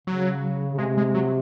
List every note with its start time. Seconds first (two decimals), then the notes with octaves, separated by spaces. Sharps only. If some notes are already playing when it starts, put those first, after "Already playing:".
0.07 C#3 F#3
0.74 C#3
0.78 C3 G#3
0.97 G#3
1.14 F#3